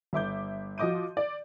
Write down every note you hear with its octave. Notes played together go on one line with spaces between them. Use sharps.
G1 E5 D6 G6
F3 F#4 D#5 D6 G6 D#7
D5